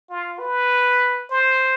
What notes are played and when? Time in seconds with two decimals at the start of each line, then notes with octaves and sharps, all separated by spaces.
0.10 F4
0.39 B4
1.30 C5